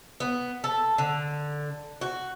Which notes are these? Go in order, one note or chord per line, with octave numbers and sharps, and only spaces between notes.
B3
A4
D3
F#4